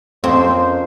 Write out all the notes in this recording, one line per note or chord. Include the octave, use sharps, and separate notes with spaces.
F2 A#3 C4 C#4 C5